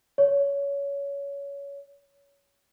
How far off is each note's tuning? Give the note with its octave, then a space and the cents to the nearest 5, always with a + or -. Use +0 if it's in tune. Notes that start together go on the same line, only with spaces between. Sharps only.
C#5 +20